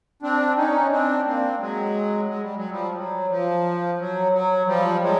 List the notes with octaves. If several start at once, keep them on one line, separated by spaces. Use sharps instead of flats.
C4 D4
C#4 D#4
C4 D4
A#3 C4
F#3 G#3
G#3
G3
F#3
F3 G3
F#3
F3
F#3
F#3
F3 G3
F#3 G#3